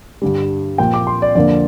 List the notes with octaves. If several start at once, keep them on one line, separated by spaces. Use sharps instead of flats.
G2 D3 G3
A#2 F3 A#3 G5
D6
C6
D5
F2 D3 A#3 D5